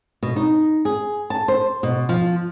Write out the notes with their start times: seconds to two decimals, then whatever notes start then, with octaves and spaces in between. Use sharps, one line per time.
0.23 B2
0.36 D#4
0.85 G#4
1.30 A5
1.48 C5
1.83 B2
2.09 F3